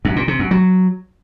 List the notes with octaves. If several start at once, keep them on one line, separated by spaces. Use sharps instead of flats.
F#2
A#2
C3
F#2
F#3